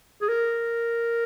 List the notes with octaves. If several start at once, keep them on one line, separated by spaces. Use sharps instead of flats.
G#4
A#4